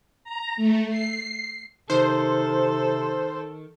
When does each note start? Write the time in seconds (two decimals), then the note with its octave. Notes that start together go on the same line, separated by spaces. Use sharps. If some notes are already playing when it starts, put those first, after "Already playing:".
0.24 A#5
0.56 A3
0.89 C7
1.90 C3 D#3 A4 C5